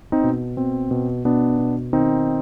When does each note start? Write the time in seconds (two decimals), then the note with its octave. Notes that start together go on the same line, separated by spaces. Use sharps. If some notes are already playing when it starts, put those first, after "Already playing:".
0.12 C4 D#4
0.24 B2
0.57 B2 C4
0.91 B2
1.25 B2 B3 D4
1.59 B2
1.93 D#3 C4 D#4